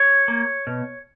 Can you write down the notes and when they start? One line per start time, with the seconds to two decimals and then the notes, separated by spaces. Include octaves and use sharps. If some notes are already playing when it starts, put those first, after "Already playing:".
Already playing: C#5
0.28 A#3
0.67 B2